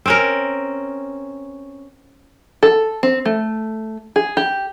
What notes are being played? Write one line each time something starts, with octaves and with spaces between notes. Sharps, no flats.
C4 C#4 A#4
A4
C4
A3
G#4
G4